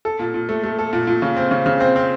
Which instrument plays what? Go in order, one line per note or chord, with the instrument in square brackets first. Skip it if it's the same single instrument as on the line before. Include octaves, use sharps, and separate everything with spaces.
[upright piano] A4
A#2
A#2
A3
A3
A4
A#2
A#2
C#3
C4
C#3
C#3
C4
C4